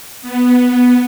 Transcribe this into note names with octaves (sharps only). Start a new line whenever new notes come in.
B3